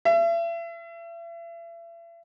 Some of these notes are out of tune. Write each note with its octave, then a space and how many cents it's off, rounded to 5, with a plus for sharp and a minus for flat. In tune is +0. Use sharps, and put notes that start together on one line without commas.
E5 +40